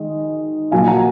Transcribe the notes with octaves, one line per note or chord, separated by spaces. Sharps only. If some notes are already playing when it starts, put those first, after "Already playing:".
Already playing: D#3 G#3 D#5
A#2 F#3 A#3 F5 G#5
F#5 A#5